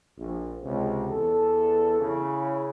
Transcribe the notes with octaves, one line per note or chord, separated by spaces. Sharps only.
A#1
C#2 C3
E2 A4
C#3 E4